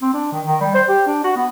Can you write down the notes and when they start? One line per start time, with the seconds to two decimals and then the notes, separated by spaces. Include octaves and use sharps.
0.02 C4
0.14 D4
0.32 D#3
0.46 D#3
0.61 G3
0.75 C5
0.89 G4
1.07 D4
1.24 F#4
1.36 B3